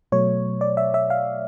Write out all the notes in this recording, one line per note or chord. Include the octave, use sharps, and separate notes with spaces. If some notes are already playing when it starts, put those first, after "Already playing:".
B2 F#3 A3 C#5
D5
E5
E5
F5